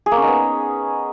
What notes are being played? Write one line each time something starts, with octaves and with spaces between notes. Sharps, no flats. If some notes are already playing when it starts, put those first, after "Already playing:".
G#4
A#3
C#4
D#4
B3